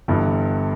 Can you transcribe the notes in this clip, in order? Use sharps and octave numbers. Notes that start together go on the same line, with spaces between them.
G1 G2 E3